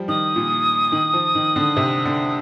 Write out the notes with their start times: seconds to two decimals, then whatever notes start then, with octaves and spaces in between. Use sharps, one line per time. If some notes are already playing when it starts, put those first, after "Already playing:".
Already playing: F3 G3
0.08 D#3 D#6
0.36 A#2
0.92 D#3
1.13 F3
1.35 D#3
1.56 D3
1.77 C3
2.05 D3